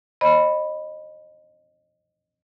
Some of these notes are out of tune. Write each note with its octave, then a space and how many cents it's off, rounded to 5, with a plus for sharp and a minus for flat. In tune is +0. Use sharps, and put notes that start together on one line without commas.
C5 +40 D#5 -20 B5 +0